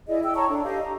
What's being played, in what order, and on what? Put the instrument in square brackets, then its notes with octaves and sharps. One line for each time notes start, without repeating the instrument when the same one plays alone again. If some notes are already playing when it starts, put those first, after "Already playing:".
[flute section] E4 G#4 D5 D#5
G5 E6
C#5 A5 A#5 C#6
D4 A4
G4 D#5 F5
A#5